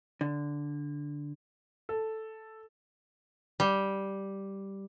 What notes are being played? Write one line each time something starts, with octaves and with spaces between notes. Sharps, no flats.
D3
A4
G3